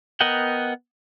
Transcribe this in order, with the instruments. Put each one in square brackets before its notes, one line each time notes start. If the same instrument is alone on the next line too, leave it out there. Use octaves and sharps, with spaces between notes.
[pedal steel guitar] B3 A#4 D#5 F#5 G5